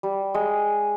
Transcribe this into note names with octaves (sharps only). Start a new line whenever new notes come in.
G3
G#3